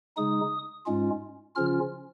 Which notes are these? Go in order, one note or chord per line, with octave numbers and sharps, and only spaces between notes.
C#3 G#3 D#4 D#6
G#2 G#3 C#4 F4
C#3 F3 C#4 F4 F6